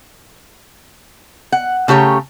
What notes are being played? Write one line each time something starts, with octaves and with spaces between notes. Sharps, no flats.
F#5
C#3 A3 G4 C#5 A#5